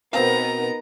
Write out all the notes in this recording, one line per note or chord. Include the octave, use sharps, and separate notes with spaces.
B2 B3 C4 D#4 A#4 F5 A#5